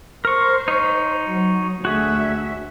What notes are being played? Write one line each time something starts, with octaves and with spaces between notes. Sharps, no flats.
A#4 C5 C#6
D#4 C#5
F#3
D2 F#4 G#4 E5